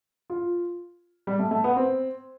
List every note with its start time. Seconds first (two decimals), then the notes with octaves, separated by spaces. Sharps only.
0.30 F4
1.27 G3
1.39 A3
1.51 A3
1.64 B3
1.77 C4